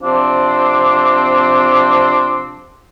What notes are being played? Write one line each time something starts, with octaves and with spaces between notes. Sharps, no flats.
C3 F3 C4 D4